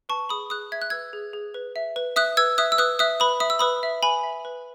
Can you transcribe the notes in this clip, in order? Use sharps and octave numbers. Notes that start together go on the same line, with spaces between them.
B4 A5 C#6
G#4 B5 D#6
G#4 D#6 F#6
E5 G#6
F#6
B4 E6 G#6
G#4
G#4
B4
E5
B4
E5 D#6 F#6
B4 E6 G#6
E5 D#6 F#6
E6
B4 D#6 F#6
E5 D#6 F#6
B4 B5 D#6
E5 D#6
E6
B4 B5 D#6
E5
B4 G#5 B5
E5
B4